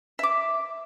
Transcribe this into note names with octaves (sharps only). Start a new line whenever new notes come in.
E5 D6